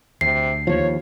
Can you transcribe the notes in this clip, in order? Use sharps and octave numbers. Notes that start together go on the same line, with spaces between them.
D2 C3 C7
D#2 F3 C#5